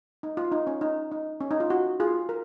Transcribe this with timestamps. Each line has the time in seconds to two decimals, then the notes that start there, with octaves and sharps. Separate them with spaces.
0.23 D#4
0.37 F4
0.52 D#4
0.67 C#4
0.81 D#4
1.12 D#4
1.41 C#4
1.51 D#4
1.60 F4
1.70 F#4
2.00 F4 G#4
2.29 A#4